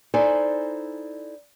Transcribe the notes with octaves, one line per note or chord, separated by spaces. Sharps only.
D#4 E4 A4 C5 D5 G#5